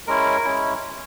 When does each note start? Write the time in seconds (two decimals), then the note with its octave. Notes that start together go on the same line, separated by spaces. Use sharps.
0.07 G#3 C#4 E4 A#4
0.44 G#3 C#4 E4